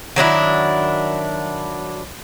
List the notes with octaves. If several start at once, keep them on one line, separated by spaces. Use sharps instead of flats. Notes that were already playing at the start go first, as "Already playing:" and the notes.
D#3 F#3 D4 E4